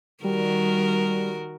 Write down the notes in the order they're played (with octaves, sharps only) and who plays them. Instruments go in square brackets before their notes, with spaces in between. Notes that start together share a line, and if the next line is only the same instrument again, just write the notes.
[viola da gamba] D#3 F#4 A#4 [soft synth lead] G3